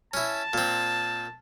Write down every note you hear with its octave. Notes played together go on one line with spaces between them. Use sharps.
C#4 E4 A5
A#2 C4